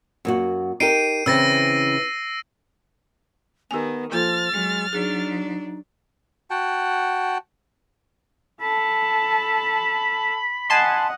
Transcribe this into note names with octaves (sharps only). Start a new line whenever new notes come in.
F#2 A#3 F#4
D#4 G4 A#4 C7 D7 D#7
C#3 E3 C4 E6 A6 A#6
D#3 B3 G4 G#5
F3 A#3 F4 A4 F6 A6
F#3 G#3
F#3 D4 D#4 G#4
F#4 F#5 G5 A5
A4 A5 B5
D#5 F#5 G#5 A5 C6